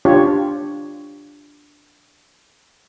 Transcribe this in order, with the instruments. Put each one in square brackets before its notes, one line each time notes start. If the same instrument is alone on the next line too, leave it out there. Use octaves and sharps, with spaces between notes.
[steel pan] D4 F4 G4 C#5